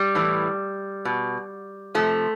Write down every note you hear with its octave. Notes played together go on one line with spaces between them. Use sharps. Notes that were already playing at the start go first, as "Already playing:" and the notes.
Already playing: G3
A2 E3
B2
C3 F3 A3